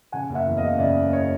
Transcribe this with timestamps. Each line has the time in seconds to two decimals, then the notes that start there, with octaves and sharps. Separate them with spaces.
0.12 C#3 F#5 G#5
0.29 F#1
0.35 E5 F#5
0.46 E2
0.57 D#5 F5
0.63 F#1
0.79 C#3 D5 E5
0.96 F#1
1.12 C#5 D#5